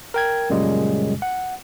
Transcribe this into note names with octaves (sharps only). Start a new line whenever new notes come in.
A#4 G5 G#6
F#2 A#2 C#3 G3 G#3
F#5